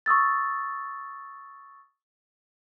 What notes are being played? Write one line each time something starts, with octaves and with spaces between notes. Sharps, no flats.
C#6 D#6 E6 A6